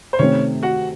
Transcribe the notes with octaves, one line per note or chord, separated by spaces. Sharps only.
C5
C3 D#3 A3 C4 C#4 C#5
F#4 F#5